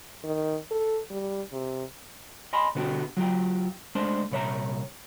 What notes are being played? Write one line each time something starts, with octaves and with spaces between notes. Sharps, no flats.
D#3
A4
G3
C3
D#5 G#5 B5 C6
B2 D3 B3 F#4 G4 A4
F#3 F4 G4 G5
G#3 A3 D4 C5 A5
C2 A#2 C#5 E5 A5 A#5